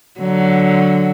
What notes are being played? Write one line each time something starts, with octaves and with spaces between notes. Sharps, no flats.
D3 F#3